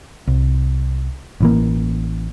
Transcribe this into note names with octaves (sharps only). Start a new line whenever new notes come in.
C2
A1 E3 A#3